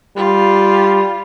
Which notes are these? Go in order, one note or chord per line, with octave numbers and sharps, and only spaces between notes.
G3 F4